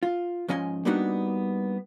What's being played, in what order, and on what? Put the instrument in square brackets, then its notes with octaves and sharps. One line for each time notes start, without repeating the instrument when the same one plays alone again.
[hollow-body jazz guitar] F4
G#2 F3 C#4 D#5 G#5
G3 A#3 B3 D4 D#4 F#4